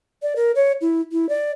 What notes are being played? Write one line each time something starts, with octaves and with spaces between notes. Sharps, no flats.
D5
A#4
C#5
E4
E4
D5